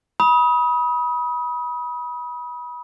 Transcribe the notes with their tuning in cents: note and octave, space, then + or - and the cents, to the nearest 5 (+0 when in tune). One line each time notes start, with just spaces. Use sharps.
B5 -25 D#6 +25